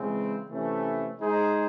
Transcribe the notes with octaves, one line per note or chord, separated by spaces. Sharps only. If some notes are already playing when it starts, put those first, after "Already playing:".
Already playing: C#3 E3 G#3 C4
C3 E3 A3 C#4
G#3 D#4 G#4 C5